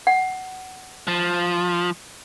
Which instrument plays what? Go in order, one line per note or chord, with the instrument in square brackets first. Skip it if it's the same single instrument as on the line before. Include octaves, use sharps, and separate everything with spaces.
[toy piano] F#5
[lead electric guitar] F3